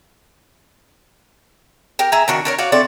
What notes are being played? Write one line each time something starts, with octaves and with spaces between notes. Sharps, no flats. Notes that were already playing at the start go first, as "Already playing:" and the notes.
G4 A#4
G#4 E5 A#5
D#3 D4 F#4
D4 A#4 C#5
F#4 C#5 D5 F5
A3 C4 D4 D5